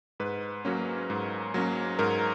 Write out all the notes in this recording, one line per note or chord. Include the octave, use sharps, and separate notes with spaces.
G#2 B4
F#3 A#3 C#4
G#2
F#3 A#3 C#4
G#2 A#4